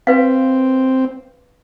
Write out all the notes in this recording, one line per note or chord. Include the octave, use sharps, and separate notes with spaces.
C4 B4 F5